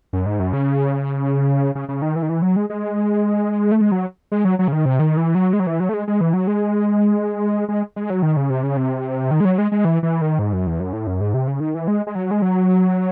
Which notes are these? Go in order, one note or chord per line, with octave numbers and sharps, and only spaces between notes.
F#2
G#2
F#2
C#3
C#3
C#3
D#3
E3
D#3
E3
F#3
G#3
G#3
A3
G#3
F#3
G#3
F#3
F#3
C#3
D#3
C3
D#3
E3
F#3
G#3
F#3
E3
F#3
A3
G#3
G#3
E3
F#3
G#3
G#3
G#3
F#3
D#3
C#3
C3
C#3
C3
D#3
G#3
F#3
G#3
G#3
E3
E3
D#3
G#2
F#2
E2
F#2
A2
F#2
G#2
C3
C#3
D#3
E3
G#3
G#3
F#3
G#3
F#3